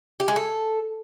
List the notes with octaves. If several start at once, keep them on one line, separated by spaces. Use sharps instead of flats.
G4
G#3
A4